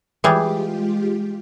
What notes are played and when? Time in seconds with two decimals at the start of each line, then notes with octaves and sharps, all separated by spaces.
0.24 E3 G3 G#3 F4 G4 G#4